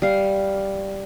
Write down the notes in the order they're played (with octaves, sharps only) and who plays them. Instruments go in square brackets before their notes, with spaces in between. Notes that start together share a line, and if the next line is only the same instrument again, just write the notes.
[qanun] G3 F5